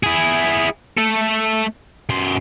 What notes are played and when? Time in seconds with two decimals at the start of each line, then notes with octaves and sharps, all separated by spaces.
0.03 E4 G#4
0.97 A3 A4
2.10 F#2 C6